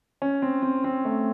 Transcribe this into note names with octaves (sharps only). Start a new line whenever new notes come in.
C#4
C4
C4
C4
A3